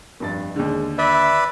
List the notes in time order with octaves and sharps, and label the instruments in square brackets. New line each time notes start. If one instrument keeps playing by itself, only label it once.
[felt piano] F1 G2 A6
[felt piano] D#2 D3 [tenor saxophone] G#3
[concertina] B4 D5 [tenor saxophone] E5